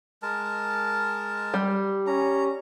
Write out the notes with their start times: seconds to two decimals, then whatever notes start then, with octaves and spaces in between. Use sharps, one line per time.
0.23 G#3 A#4 A5
1.54 G3
2.07 C#4 A#5